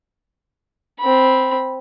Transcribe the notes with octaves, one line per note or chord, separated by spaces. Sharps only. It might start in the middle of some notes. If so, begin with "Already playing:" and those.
C4 B5